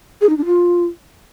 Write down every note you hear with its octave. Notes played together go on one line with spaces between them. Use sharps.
G#4
D#4
D4
F4